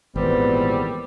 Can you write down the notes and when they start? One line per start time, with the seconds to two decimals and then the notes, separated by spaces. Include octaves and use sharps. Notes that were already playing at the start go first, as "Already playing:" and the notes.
0.16 G#1 E2 A#2 G3 B3 C4